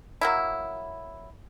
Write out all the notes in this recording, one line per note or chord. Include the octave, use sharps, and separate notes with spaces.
F#3 A#3 E4